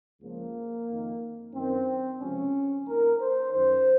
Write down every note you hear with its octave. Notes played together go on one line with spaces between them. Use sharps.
C#2 C#3 F3 A#3
F2 D#3
F#2 D#3 C4
C#2 C3 F3 C#4
D#2 D#3 A#4
C5
F#2 D#3 C5